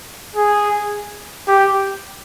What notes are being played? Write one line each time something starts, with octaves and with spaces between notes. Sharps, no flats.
G#4
G4